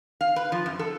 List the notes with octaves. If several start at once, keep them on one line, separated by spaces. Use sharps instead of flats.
F5
B4
F3
F#2
A4